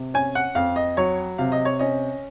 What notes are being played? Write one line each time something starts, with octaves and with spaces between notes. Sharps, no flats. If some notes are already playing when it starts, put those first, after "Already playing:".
Already playing: C3
C#4 G#5
F#5
F2 F5
D#5
F#3 C#5
C3 F5
D#5
C#5
C#4 D#5